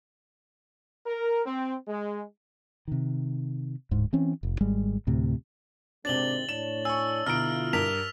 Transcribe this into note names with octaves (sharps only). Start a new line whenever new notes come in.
A#4
C4
G#3
C3 D#3
D1 G#2
E3 C4 C#4
F1
G#1 G3 G#3
D2 A2 C3
G#1 C3 G#3 C4 D4 A6 F#7 G7
A2 D4 C#5 E7
G#5 C#6 E6
B2 D3 E4 F4 A#5 F6 D7
G2 A#4 B6 F7